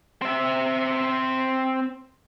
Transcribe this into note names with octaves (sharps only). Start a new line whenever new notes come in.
C4 E5